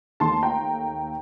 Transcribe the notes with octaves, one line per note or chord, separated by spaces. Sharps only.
D#2 D#3 A3 A5 C6
G5 A#5